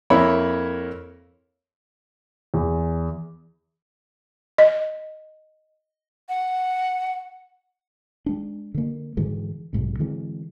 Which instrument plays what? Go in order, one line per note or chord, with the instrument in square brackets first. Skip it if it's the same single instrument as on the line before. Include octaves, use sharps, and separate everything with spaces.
[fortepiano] F2 A#3 E4 C#5 B5
[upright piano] E2
[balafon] D#5
[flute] F#5
[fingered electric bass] G#3 D4
D3 A#3
G#2 D3 E3 G#3
B1 G#2 C3
D3 E3 G#3 C4